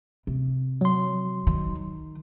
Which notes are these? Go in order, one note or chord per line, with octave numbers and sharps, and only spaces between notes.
C3
F#3 C6
D#3